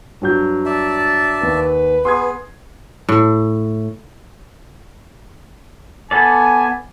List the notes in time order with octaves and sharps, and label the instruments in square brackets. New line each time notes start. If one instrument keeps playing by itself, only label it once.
[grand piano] G2 F#3 G6
[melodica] D5 E5 A5
[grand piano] D#2 [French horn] B4
[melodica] B3 G#4 [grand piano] C6 D#6 G#6
[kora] A2
[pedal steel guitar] B3 A4 D5 [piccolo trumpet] G#5